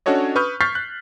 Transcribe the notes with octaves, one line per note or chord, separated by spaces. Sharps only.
C#4 D4 F#4 A4 C#5 D#5
B4 C#6 D#6 F6 G6
C#6 F6 G6 A6 B6 C7
F#6